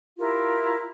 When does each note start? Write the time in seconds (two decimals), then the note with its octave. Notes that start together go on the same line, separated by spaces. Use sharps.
0.18 E4 F4 G4 A#4